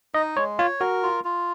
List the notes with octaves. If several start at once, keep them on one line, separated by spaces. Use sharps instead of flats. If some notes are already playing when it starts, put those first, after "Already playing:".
D#4 D#5
G#3 C#5
F4 C#5
F#4 A#4
F4
F4